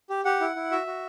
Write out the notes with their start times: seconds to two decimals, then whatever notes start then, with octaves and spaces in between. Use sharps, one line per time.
0.10 G4
0.25 G4 F#5
0.41 E4
0.56 E4
0.71 F#4 E5
0.87 F#4